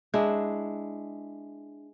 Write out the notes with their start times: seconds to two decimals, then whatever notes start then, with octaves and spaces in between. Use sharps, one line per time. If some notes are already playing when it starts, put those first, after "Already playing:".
0.14 G#3 D4 E4